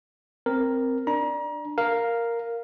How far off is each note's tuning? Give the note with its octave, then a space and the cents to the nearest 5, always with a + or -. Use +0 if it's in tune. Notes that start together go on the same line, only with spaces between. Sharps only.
C4 +0 A#4 +0
D4 +15 A#5 +35
A#4 +0 F5 +0